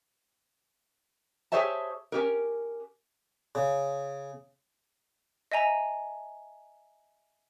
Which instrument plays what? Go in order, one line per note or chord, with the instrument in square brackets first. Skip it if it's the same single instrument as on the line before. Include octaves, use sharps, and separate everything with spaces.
[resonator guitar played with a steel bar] G4 G#4 C5 C#5 E5 A5
C#4 G4 A#4
[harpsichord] C#3
[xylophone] D#5 E5 G#5 A#5